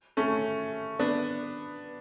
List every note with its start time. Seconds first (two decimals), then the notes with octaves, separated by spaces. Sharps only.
0.17 A3 C#4
0.99 B3 D4